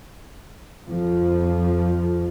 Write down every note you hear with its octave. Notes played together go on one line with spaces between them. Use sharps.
F2 F3